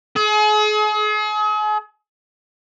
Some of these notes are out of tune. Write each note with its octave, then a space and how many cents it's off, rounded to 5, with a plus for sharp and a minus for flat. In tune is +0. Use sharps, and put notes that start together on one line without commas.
G#4 +40